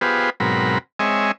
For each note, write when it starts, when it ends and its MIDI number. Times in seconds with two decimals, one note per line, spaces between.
0.01 0.30 59
0.01 0.30 65
0.01 0.30 67
0.01 0.30 68
0.01 0.30 71
0.01 0.30 72
0.40 0.78 44
0.40 0.78 47
0.40 0.78 54
0.40 0.78 60
0.40 0.78 70
0.40 0.78 83
0.99 1.32 56
0.99 1.32 60
0.99 1.32 73
0.99 1.32 75
0.99 1.32 76
0.99 1.32 80